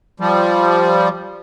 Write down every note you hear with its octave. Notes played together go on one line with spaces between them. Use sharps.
F3 G3